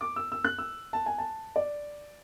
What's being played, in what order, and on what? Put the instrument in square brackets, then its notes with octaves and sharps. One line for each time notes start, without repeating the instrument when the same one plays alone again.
[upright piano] D6
E6
E6
F#6
E6
A5
G#5
A5
D5